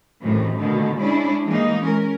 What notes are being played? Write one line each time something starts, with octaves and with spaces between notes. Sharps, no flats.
F#2 A2 C3 D#3 E3
B2 D3 D#3 A3
G#3 C#4 D4 E4
E3 G3 G#3 A#3 D#4
C#4 A#4